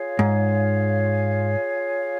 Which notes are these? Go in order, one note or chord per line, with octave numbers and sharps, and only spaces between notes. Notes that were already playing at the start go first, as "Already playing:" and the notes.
Already playing: F4 G#4 C#5 F5
G#2